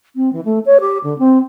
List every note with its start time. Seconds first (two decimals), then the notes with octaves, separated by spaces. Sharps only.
0.16 C4
0.33 E3
0.45 A3
0.66 C#5
0.80 G4
1.04 D3
1.19 C4